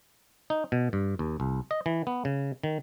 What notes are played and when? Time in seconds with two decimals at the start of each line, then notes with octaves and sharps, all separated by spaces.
0.50 D#4
0.72 B2
0.93 G2
1.19 D#2
1.40 C2
1.71 D#5
1.86 E3
2.07 B3
2.25 C#3
2.64 D#3